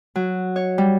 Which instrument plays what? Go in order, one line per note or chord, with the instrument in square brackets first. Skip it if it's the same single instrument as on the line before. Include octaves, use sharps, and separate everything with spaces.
[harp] F#3
C#5
G3